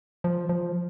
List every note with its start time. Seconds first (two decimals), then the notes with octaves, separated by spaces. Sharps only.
0.24 F3
0.49 F3